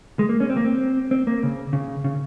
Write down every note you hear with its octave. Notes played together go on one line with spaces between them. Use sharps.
G#3
A#3
C#4
C4
A#3
C4
C4
A#3
C#3
C#3
C#3